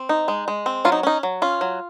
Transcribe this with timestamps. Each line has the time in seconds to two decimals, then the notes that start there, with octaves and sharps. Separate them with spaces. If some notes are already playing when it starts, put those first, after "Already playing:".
Already playing: C4
0.09 D#4
0.28 G#3
0.48 G#3
0.66 C4
0.85 F#3 F4
0.92 D#4
1.03 C#4 D#4
1.23 F#3
1.42 C#4 F4
1.61 F#3